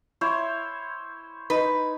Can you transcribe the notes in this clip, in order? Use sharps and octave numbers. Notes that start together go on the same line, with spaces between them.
E4 C5 C#5
D#4 B4